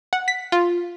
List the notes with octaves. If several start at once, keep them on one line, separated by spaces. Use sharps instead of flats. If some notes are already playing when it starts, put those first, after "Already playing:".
F#5
B6
F4